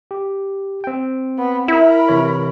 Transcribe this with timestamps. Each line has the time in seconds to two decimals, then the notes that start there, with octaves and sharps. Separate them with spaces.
0.11 G4
0.84 C4 G5
1.38 B3
1.68 E4 A#4 B5
2.08 C3 E3 C#5